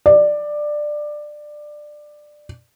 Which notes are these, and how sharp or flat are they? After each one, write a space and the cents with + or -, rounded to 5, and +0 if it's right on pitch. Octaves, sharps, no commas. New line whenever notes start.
D5 +15